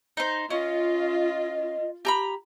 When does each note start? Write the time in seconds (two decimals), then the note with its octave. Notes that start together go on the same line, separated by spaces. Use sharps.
0.17 D#4 C5
0.50 C#4 F4 D#5
2.05 G4 A#5 B5